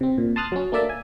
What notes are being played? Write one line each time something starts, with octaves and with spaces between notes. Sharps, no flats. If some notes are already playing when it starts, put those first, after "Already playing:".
C3 C4
A#2
A5 C6 D#6 F6 F#6 A6
F#3 C#4
A3 A#3 D4 D5 E5 A5
G#5